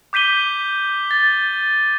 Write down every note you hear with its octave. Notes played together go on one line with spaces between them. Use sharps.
D6 G6 B6 D#7 G7
A6